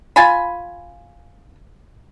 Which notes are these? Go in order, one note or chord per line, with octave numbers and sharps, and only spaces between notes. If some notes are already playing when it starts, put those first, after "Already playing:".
F4 G#5 B5